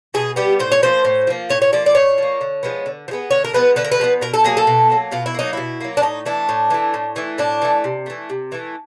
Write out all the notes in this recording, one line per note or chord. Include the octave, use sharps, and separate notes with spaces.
B2 G#4
G3 B3 G4
A2 C5
C#5
F3 A#3 C5
A2
F3 A#3
A2 C#5
C#5
F3 A#3 D5
D5
A2 C#5
F3 A#3
D3
F3 G#3 B3
D3
F3
G#3 B3
D3 C#5
A#4
F3 G#3 B3 B4
D3 B4
A#4
B4
F3 G#3 B3
B2 A#4
A4
F#3 A#3 G#4
A4
B2
F#3 A#3
B2 F4
E4
F#3 A#3 D#4
B2 E4
F#3 A#3
D4
A2 D#4
E3 A3 D4
A2
E3 A3
A2
E3 A3
A2 D4
E3 A3
C3
E3 A3
C3
E3 A3